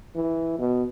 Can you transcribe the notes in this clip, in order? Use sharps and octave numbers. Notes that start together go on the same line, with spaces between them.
E3
B2